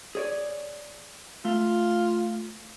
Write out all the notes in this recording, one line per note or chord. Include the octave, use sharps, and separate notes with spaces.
G#4 C#5 D5
A3 F4